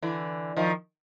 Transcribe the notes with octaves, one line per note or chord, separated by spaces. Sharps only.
D3 E3
D#3 F3